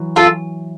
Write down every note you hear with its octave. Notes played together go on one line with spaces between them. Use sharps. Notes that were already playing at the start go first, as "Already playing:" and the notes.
Already playing: E3 F#3
F4 A4